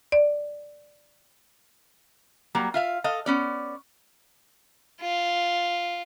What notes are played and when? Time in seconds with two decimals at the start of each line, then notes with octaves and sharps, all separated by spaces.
0.12 D5
2.55 F#3 G3 A#3
2.74 F4 E5 F5
3.04 A4 D#5 F5
3.26 B3 C#4 D5
5.01 F4